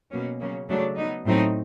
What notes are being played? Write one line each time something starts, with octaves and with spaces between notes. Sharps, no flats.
B2 F#3 A#3 C#4
C#3 F#3 A#3 C#4
C#3 F#3 A3 D4
F#3 B3 D#4
A2 F#3 A3 C4 D#4